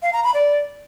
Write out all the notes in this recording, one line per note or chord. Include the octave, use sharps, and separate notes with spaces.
F5
A#5
B5
D5